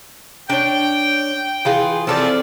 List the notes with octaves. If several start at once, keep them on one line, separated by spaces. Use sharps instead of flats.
D4 C#5 G5
E3 F4 G#4
C3 E3 F3 C4 A4 D5